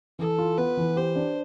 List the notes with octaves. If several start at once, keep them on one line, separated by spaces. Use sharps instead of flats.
E3 A4
F4
B3 B4
E3
G4 C5
D4